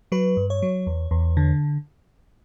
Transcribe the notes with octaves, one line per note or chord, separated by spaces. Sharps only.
F#3 B4
G2
C#5
F#3
E2
E2
D3